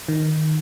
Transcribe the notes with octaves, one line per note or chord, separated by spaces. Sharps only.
D#3